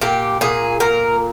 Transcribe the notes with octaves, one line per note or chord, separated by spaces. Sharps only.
A#2 G4
A#2 G#4
A#2 A#4